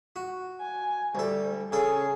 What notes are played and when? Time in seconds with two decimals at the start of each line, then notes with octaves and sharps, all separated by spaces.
0.16 F#4
0.61 G#5
1.15 D2 G3 A4
1.72 C#3 G#4 A4